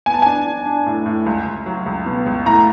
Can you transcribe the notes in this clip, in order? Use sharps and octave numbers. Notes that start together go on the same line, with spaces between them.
B3 G#5
A5
D4 G#5
D4
D4
A2
A2
C#2
C#2
F#3
C#2
B2
C#2
A2 A#5